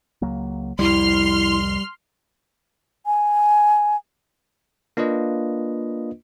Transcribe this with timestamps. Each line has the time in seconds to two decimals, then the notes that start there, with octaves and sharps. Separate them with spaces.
0.22 C#2 F#3 A#3
0.79 C2 F2 G3 E4 C6 F6
3.06 G#5
4.97 A#3 D4 F4 B4 D#5